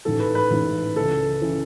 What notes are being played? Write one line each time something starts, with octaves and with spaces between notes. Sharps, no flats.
A1 G#2 E3 A4
B4
B4
A1 G#2 E3
C#2 C#3 E3 A4
C#3 E3